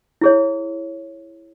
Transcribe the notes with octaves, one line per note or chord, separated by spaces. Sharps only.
E4 G#4 C#5